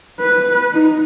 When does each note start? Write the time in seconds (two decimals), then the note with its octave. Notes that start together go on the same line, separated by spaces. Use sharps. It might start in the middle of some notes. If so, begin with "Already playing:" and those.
0.20 B4
0.73 D#4